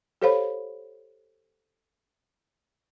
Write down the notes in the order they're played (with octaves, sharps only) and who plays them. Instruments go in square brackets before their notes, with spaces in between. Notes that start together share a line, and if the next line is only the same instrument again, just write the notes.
[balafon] G4 A4 C5 C#5 F5 B5